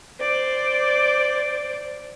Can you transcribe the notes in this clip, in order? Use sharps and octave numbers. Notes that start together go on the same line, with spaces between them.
C5 D5